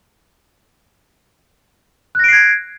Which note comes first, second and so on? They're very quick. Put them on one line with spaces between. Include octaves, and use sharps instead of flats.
F#6 A#6 D7 C7 G#6